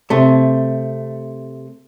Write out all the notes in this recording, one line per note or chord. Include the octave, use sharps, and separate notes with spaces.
C3 A3